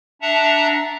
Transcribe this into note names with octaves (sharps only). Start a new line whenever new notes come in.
D4 E5 F#5 A5 A#5